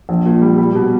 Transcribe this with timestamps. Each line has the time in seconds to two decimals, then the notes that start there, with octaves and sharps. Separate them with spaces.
0.09 A#1
0.25 A#2
0.42 G3
0.58 G3
0.75 B2